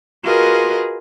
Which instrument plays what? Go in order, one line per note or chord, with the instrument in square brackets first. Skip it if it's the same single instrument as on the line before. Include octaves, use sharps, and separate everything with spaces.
[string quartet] F4 F#4 G#4 A#4 B4 D#5